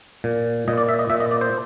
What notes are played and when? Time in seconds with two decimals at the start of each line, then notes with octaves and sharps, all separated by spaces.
0.24 A#2
0.68 A#2 D#5
0.77 D5
0.89 E5
0.99 D#5
1.10 A#2 E5
1.20 D#5
1.31 D5
1.41 C5